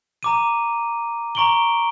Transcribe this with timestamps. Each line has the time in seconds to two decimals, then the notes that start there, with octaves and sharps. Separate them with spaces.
0.23 A#5 D6 D#7
1.35 A#5 C#6 D7 F#7 G7